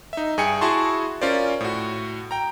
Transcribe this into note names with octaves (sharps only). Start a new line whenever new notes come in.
D#4 E5
G2 G#4 G5 G#5 C#7
E4 F#4 G#4 A5 C6 C#6
C#4 F4 A#4 C5 D5
A2 F#4
G5 A#5